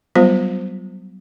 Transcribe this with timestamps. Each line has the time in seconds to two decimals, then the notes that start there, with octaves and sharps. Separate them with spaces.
0.15 F#3 G3 B3 F4 C5